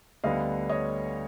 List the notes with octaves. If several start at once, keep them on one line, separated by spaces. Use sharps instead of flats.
D2 D3 G3 B3 D#5 F5
C#5 D#5